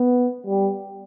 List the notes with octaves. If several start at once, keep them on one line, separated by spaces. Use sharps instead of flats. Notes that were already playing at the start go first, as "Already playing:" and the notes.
Already playing: B3
G3